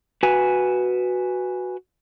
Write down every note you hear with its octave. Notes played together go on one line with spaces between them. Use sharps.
F#4 B4 G#5